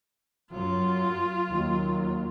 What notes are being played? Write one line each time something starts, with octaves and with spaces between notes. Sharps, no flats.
F#2 F#3 F4
D#2 F#3